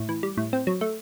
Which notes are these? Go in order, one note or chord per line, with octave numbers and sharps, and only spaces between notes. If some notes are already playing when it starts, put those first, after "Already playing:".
Already playing: A2
E3
G3
A2
C4
F#3
A3